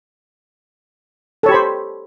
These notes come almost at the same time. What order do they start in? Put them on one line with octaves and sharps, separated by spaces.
A4 C#5 G4 B5 C5